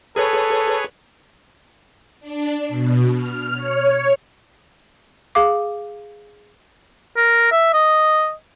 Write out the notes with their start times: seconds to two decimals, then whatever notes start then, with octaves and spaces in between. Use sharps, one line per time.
0.16 G#4 A4 B4 C#5
2.20 D4
2.69 B2
3.15 F6
3.54 C#5
5.35 G#4 F5 D6
7.17 A#4
7.52 E5
7.73 D#5